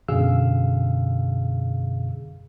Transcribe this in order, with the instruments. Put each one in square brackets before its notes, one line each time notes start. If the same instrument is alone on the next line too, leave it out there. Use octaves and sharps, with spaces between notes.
[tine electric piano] F#2 B2 D3 G#4 F5 E6